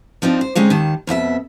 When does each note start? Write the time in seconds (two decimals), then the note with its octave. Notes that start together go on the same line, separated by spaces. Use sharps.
0.22 F3 C4 D4 D#4
0.41 C5
0.55 D3 G#3 C4 C#4 D#4
0.70 D#2 D#3 A5
1.07 F2 B2 F#4 E5